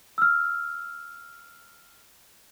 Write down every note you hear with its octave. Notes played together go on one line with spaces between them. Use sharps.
E6 F6